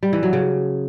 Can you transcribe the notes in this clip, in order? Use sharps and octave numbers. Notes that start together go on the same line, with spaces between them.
G3
E3
F#3
C#3